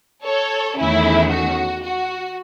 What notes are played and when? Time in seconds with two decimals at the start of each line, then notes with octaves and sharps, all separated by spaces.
0.25 A4 C#5
0.78 E2 D#3 A3 C#4 E4
1.31 F#4
1.84 F#4